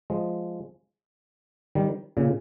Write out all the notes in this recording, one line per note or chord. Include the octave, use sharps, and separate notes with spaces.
F3 G#3
D#3 G3
A#2 C#3